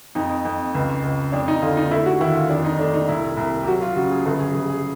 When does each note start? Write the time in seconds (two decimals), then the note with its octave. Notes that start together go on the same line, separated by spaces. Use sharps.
0.15 F2 D#4
0.45 F2
0.75 C#2
1.03 C#2
1.32 F2 D4
1.48 D#4
1.62 D3 F4
1.77 D#4
1.91 A3 E4
2.06 F#4
2.20 D#2 E4
2.36 F4
2.49 F2 D4
2.65 D#4
2.79 A3 D4
2.94 D#4
3.09 C2 E4
3.37 C2
3.63 G4
3.66 F#3 F#4
3.82 F4
3.96 C#3 F#4
4.11 G#4
4.26 G1 A4
4.40 G#4
4.54 G1 G#4
4.69 G#4